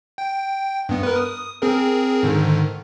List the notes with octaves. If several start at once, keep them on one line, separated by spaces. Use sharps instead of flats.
G5
G2 B3
A#4 B4
D#6
C4 G#4 A#4
G#2 D3 D#3